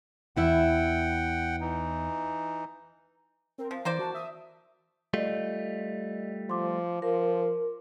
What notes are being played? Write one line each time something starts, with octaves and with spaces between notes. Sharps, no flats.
E2 E4 E5 F#5 G5
E3 D#4
C4 A#4
F3 F5
E3 A#3 C5 D5
F#4 A5
E5 D#6
G3 A3 F4 D5 D#5
F3 C6 D6
F3 A#4